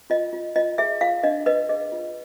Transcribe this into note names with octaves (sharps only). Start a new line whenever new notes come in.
F4 D#5
F4
F4 D#5
G#4 E5
F4 F5
D4 D#5
B4 D#5
G#4 D#5
F4